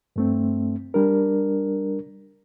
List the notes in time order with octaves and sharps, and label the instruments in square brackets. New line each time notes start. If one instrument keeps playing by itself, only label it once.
[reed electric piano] G2 A3 C4
G3 D4 A#4